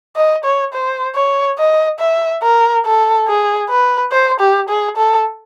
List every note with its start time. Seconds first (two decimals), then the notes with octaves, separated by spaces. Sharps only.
0.16 D#5
0.44 C#5
0.73 C5
1.15 C#5
1.58 D#5
1.99 E5
2.43 A#4
2.86 A4
3.28 G#4
3.70 B4
4.12 C5
4.40 G4
4.69 G#4
4.97 A4